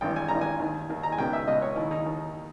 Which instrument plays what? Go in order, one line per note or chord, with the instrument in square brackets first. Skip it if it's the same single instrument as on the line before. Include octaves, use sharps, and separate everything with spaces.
[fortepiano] G#1 G2 E3 G5
G#5
G#1 G2 E3 A#5
G#5
D#2 D#3
D#2 D#3
A#5
G#5
C#2 B2 G5
E5
C#2 B2 D#5
C#5
D#2 D#3 E4
D#4
D#2 D#3